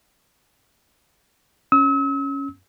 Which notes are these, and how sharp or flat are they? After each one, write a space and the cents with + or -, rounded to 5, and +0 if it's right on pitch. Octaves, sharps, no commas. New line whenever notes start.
C#4 +0 E6 -40